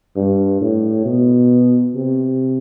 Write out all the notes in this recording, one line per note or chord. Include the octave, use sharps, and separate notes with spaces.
G2
A2
B2
C3